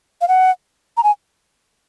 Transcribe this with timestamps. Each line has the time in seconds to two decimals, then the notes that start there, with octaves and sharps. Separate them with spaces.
0.21 F5
0.28 F#5
0.97 A#5
1.04 G#5